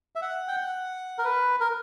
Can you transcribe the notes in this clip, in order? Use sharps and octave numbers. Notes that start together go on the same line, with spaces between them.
E5
F#5
G5
F#5
A#4
B4
A#4